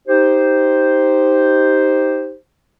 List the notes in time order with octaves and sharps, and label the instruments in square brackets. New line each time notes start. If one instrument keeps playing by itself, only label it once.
[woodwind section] D#4 G4 C5